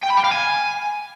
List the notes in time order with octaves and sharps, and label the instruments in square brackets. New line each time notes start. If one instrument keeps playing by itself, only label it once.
[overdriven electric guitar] G5
B5
G5
F5
G#5